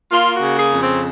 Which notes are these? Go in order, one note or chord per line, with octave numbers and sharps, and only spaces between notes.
A#3 F4
F#4
C#3
G#4
F2
C4